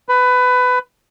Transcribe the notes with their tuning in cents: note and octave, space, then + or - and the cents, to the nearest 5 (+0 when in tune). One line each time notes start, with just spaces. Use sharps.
B4 +20